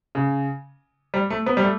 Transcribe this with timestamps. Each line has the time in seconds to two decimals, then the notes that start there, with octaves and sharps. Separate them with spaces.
0.15 C#3
1.14 G3
1.30 A3
1.46 B3
1.57 G3
1.63 A3